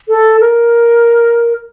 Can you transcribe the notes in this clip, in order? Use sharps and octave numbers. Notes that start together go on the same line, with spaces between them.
A4
A#4